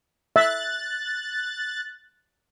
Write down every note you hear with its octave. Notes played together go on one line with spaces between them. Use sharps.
E5 F#6 A6